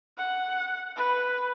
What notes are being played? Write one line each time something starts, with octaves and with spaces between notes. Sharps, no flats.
F#5
B4